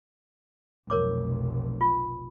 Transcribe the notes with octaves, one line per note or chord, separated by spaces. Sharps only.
F1 B1 A#4 C#5 D6
F4